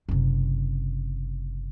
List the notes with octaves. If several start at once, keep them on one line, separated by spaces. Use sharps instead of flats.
F#1 C3